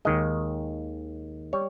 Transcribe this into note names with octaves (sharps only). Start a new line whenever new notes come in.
D#2 D#3 G#3 D#5
G3 C#5